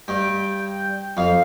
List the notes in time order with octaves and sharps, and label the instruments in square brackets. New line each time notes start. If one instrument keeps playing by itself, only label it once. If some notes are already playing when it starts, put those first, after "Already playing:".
[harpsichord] G2 [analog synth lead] G5
[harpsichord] F2 [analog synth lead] F5